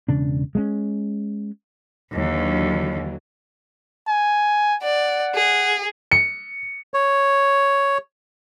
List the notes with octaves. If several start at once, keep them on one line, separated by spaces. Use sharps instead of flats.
E1 C#3 D4
G#3 A3 C#4
D#2 D3 E3 F#3
G#5
D5 F#5
G#4
C#7
C#5